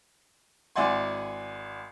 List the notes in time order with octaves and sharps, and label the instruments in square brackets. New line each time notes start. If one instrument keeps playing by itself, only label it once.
[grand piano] G#1 E4 D5 F#5 G#5 C6